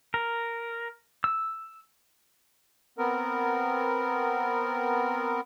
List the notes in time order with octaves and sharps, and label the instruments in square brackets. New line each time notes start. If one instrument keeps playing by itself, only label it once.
[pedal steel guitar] A#4
E6
[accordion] B3 C4 A#4